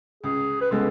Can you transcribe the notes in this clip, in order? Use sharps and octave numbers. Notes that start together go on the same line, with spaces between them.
C#2 G#4
B4
C#3 G#3 B3 A4